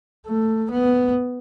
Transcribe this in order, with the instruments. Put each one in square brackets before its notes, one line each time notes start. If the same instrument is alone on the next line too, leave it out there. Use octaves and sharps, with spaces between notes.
[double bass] A3
B3